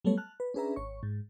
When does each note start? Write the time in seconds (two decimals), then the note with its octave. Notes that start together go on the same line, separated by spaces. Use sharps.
0.04 F#3 G3 A3 B3 A4 C#5
0.18 A5 F6 F#6
0.40 B4
0.54 C#4 D4 G#4 B4 E5 A#5
0.76 G#1 C#5 C#6
1.03 G#2